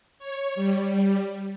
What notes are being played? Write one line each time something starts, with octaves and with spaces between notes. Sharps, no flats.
C#5
G3